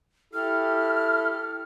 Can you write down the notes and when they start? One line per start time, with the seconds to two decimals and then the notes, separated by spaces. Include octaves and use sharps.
0.33 E4 G4 A4 F6